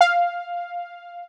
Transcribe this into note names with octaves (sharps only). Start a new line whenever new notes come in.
F5